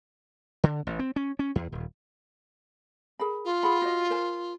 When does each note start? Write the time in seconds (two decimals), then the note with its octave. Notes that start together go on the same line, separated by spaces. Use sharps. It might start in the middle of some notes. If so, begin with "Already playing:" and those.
0.64 D3
0.87 A1
0.99 C4
1.16 C#4
1.39 C#4
1.55 E2
1.72 D#1
3.19 G#4 A#4 B5
3.45 F4
3.63 G#4 F#5 B5
3.82 F#4 C5 D#5
4.10 A#4 C5 G#5